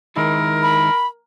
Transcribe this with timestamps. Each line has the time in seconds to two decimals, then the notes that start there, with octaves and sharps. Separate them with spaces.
0.16 D#3 G#3 E4 A#4
0.63 B5